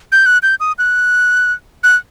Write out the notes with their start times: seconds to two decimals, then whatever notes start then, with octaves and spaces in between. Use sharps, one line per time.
0.12 G6
0.26 F#6
0.43 G6
0.60 D#6
0.78 F#6
1.84 F#6